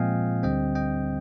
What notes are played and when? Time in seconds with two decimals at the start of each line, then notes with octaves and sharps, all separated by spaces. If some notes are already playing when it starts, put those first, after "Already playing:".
Already playing: A#2 F3 G#3 C4 D#5 F5 G5 G#5
0.43 D2 D3 G3 C4 D#5 G5
0.75 D#5 G5